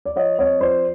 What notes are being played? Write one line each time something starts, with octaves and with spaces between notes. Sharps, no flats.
D5
F3 C#5 D#5
C4 C#5 D#5
F3 C5 D5